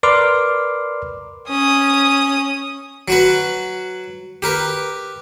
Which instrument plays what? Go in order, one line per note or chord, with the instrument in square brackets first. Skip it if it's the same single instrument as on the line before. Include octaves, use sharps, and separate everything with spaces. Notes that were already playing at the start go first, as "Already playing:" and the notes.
[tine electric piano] A#4 B4 D5 C6 D6 F6
[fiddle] C#4 D#6
[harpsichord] F#3 F#4 B4
G4 A#4 B4